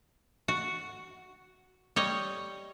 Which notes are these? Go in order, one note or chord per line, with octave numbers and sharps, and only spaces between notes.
F#4
G3 C#5 D#5